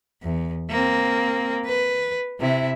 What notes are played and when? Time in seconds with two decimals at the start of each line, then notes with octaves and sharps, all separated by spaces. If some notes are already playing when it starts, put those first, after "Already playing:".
0.23 E2
0.70 A#3 C4
1.65 B4
2.40 C3 E4